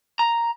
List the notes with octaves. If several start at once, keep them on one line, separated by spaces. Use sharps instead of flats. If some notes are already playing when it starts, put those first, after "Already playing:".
A#5